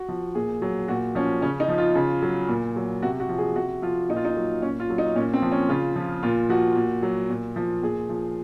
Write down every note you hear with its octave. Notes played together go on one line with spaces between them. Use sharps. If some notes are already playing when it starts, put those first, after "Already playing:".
Already playing: F#4
F3
A#2 G#4
F#3
A#2 F#4
F3 C#4
C#3 C#4
D#4
F3
F4
C#3
F#3
A#2
F#3
C3 F#4
F#4
F3
G#4
C3 F#4
F3 F4
A#2 D#4
F4
D#4
F#3
A#2 C#4
F4
F#3
D#4
A#2 C#4
C4
F3
C#4
C#3 F4
F3
A#2 F4
F3 F#4
A#2
F#3
A#2
F3
A#2 G#4
F3